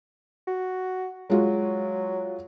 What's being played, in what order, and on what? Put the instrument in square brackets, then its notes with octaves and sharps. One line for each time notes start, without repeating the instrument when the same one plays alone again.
[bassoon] F#4
[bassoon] F#3 [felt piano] G#3 F4 F#4